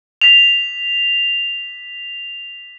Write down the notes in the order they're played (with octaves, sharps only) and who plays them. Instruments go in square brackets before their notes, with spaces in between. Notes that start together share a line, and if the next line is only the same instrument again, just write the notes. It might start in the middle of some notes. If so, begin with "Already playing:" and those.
[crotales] B6 F7